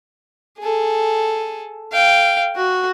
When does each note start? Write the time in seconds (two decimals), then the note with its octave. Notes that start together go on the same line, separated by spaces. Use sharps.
0.59 G#4 A4
1.92 F5 G5
2.56 F#4